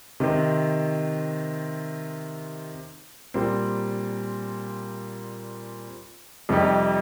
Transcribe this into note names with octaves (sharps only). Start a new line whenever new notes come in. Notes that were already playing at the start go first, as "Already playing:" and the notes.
C3 D#3 C4
A#2 G3 C4
F2 C3 G3 D#4 G4